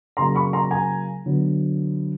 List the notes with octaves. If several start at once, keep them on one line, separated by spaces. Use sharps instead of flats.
C#3 F#3 A#3 A#5 C6
B5 C#6
A#5 C6
G#5 A#5
D3 F#3 B3